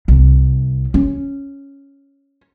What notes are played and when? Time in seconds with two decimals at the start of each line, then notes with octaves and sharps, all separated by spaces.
0.08 C2
0.94 C#4